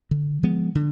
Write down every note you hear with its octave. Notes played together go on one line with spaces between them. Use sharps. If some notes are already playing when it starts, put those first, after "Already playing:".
D3
F3 G#3 B3
D3